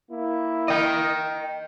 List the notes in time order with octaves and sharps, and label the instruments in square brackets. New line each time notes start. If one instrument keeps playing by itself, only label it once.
[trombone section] A#3 E4
[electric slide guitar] D#5 G5